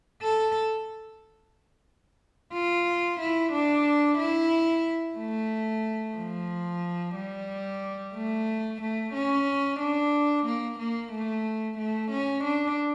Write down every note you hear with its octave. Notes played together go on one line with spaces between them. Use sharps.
A4
F4
E4
D4
E4
A3
F3
G3
A3
A3
C#4
D4
A#3
A#3
A3
A3
C#4
D4